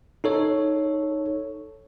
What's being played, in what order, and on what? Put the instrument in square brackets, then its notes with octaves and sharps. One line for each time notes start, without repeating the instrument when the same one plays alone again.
[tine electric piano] D#4 A4 C#5